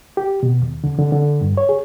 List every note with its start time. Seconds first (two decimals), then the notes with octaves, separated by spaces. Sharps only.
0.17 G4
0.43 B2
0.61 D#2
0.84 D3
0.98 D3
1.12 D3
1.41 G2
1.57 C#5
1.69 G#4